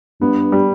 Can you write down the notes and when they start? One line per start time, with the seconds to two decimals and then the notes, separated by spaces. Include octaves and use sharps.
0.21 G2 B3
0.52 G3